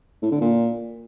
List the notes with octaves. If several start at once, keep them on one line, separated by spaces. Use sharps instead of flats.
A2
D3
A#2